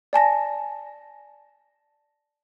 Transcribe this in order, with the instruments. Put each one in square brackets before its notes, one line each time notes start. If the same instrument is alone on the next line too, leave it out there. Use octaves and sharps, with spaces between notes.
[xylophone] D5 G#5 A5 A#6